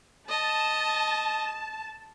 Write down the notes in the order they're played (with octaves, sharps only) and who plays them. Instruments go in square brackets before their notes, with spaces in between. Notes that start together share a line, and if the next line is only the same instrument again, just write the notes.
[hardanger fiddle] D#5 [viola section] A5